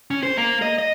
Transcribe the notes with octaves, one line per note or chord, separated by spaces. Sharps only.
C#4
C5
A#3
D#5
D#5